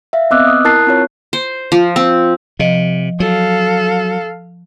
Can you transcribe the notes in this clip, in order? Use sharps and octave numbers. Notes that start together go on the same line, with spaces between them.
E5 F5
B3 C4 D#5 D6 E6 F#6
D#6
E4 A#4 A5 F#6 A6 C7
C4 F4 C#5
C5
F3
C4
C3 F3 D#5
F#3 A4 F5